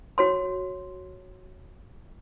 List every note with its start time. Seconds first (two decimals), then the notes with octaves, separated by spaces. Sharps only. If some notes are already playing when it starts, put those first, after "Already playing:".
0.18 F#4 C#5 C6